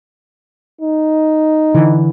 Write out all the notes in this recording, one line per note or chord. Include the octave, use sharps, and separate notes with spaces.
D#4
D3 E3